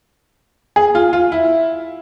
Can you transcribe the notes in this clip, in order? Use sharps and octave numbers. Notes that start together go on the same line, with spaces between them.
G#4
F4
F4
E4